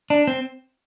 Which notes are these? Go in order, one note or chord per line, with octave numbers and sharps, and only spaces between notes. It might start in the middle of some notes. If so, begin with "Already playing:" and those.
D4
C4